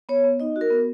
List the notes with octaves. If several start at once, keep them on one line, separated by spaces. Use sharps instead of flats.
B3 C#5
B3
D#4 D#5
F#4
A#4
B3